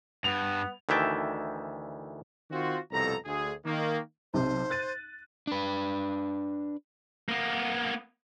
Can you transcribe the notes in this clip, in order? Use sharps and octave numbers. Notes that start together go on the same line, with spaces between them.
G2 B3 F7
D2 D#3 E3 E5 G5 A5
D#3 C4 F4 F#4
C2 F2 B2 A4 A#5
D2 G#4
D#3 A#3
B1 C3 C5
F#6 A6 D#7
D4 B4
A#3 B3